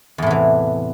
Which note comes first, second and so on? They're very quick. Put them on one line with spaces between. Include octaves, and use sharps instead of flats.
E2 A2 C3 E3